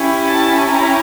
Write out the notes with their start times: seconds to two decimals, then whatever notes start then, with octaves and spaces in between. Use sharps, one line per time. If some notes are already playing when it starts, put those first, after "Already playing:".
Already playing: C#4 E4 G4
0.28 A5
0.69 A#5